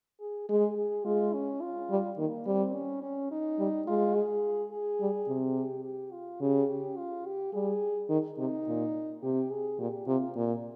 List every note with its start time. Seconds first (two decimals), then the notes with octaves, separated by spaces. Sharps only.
0.20 G#4
0.49 G#3 G#4
0.78 G#4
1.05 G#3 F4
1.34 C#4
1.62 F4
1.90 G3
2.18 D#3 A#3
2.46 G3 C4
2.75 C#4
3.02 C#4
3.31 D#4
3.59 G3
3.87 G#3 F4
4.15 G#4
4.72 G#4
5.01 G3
5.28 C3
5.57 G4
5.85 G4
6.12 F4
6.41 C#3 G4
6.69 G4
6.98 F4
7.26 G4
7.53 G3 G#4
8.10 D#3
8.38 C3 D#4
8.66 A#2
9.22 C3 G4
9.51 G#4
9.79 A#2 G4
10.07 C3 F4
10.36 A#2